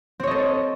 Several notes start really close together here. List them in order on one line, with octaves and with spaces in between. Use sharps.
C4 C#5 D#5 A4